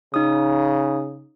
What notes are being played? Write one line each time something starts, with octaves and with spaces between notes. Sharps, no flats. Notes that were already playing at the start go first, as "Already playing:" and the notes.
C#3 D#4 D#6